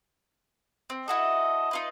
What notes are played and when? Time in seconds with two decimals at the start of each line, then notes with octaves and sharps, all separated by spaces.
0.90 C4
1.08 E4 F#4 A4 D#5
1.71 D#4 F4 B4